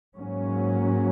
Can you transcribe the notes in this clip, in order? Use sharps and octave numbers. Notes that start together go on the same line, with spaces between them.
G#2 F#3 A#3 C#4